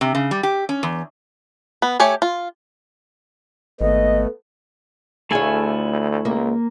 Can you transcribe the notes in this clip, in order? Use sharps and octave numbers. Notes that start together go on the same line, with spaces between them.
C3
C#3
G3
G4
C#4
E2
B3
A3 G4 C#5 G#5
F4
G#1 A3 B3 D#5
D2 A3 E4 F4 G#4 C#5 G#5
C#2 A#3